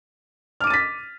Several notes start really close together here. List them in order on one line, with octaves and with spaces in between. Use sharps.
F6 D6 D#7 A6 B6